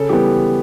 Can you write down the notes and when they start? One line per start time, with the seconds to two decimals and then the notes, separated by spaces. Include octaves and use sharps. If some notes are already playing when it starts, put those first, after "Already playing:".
Already playing: C#3 A4
0.09 E3 G3 B3 G4